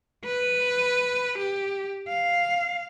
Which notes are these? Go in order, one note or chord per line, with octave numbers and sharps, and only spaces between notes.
B4
G4
F5